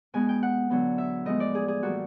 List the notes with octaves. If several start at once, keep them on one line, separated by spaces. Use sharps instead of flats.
B2 G#3 B3 G#5
G5
F#5
D3 F#3 B3
E5
A2 F3 G#3 B3 D#5
D5
G#4
G#4
A2 E3 G3 A#3 F#4